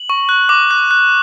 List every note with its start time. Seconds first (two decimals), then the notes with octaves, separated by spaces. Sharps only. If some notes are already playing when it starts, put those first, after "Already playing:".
Already playing: F#7
0.10 C#6
0.29 F#6
0.49 D6
0.71 F#6
0.91 F#6